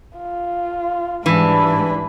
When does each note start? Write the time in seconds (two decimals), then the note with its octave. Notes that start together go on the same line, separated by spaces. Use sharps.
0.16 F4
1.26 G#2 E3 G3 D4 B5